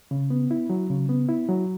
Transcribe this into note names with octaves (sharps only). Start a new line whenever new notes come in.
C#3
B3
E4
F#3
C#3
B3
E4
F#3